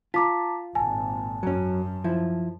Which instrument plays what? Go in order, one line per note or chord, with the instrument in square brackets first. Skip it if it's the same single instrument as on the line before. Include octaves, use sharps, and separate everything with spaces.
[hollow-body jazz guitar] F4 [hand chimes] A5 A#5 [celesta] D6 B6
[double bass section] G#1 A#2 [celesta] G#5 [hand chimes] A5
[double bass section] F#2 [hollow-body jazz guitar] F#3 C#4
[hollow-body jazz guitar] F3 E4